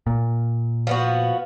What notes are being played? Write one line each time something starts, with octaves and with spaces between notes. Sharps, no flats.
A#2
F3 B3 F#4